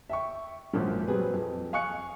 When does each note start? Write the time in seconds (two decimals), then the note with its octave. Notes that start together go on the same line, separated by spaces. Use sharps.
0.09 E5 G5 C#6
0.73 G#1 F#2 A#2 F3
1.08 F#3 G3 C4 G4 G#4 B4
1.34 F2
1.73 F5 G#5 C#6 F#6 C#7